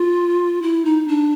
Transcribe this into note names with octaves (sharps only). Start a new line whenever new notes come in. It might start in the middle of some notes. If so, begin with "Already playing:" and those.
Already playing: F4
E4
D#4
D4